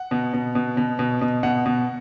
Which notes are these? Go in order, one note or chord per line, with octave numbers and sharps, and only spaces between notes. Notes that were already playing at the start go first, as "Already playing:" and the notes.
Already playing: F#5
B2
B2
B2
B2
B2
B2
B2 F#5
B2